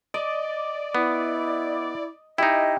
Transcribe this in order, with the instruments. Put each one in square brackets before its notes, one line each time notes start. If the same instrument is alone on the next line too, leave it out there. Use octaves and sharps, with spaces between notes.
[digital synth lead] D5 [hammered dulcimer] D#5
[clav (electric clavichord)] B3 [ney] E4
[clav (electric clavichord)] D#4 E4 [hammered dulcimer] G4 [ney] D#5